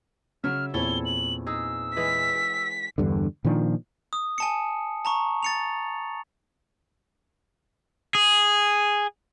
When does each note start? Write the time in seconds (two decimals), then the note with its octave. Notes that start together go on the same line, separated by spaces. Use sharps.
0.44 C#3 F#3 C#5 E5 F6
0.74 E2 A#2 C4 E4 A4 C#5 G7
1.05 F#7
1.47 D#4 G#4 E6
1.97 E3 G#3 D#5 B6
2.98 E2 G2 D3
3.45 A#2 D#3 F3 D4
4.13 D#6
4.38 G#5 A5 C#7
5.05 A5 A#5 C#6
5.43 A6 C#7 F7
8.15 G#4